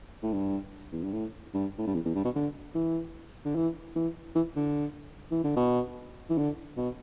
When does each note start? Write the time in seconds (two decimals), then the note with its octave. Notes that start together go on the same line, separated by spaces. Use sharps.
0.23 A2
0.33 G2
0.92 E2
1.03 G2
1.13 A2
1.54 G2
1.78 A2
1.87 G2
1.94 E2
2.05 E2
2.15 G2
2.25 B2
2.35 D3
2.75 E3
3.45 D3
3.56 E3
3.95 E3
4.35 E3
4.56 D3
5.31 E3
5.44 D3
5.56 B2
6.29 E3
6.38 D3
6.77 B2